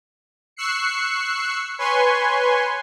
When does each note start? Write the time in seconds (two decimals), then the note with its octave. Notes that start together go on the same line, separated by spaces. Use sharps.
0.57 C#6 E6 F#6 C7 C#7
1.78 B4 C#5 G#5 C6 C#6